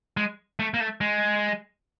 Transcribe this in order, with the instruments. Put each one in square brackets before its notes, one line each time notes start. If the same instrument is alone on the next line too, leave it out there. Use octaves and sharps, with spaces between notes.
[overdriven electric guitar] G#3
A3
A#3
A3
G#3